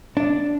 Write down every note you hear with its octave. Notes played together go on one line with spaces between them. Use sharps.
D4